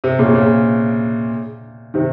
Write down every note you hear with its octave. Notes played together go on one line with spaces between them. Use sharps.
C3
A#2 C#3
A#2 C#3
C3 D#3